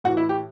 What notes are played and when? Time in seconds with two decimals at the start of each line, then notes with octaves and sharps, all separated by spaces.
0.04 A2 F#4
0.08 E3
0.17 E4
0.29 G4